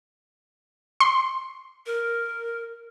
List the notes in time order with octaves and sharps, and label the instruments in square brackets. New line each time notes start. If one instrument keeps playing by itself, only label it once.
[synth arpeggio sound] C6
[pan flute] A#4